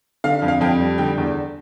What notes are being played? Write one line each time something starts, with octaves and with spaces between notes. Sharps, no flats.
D3 F5
F2
F5
F2 G5
G3
D3 G5
E2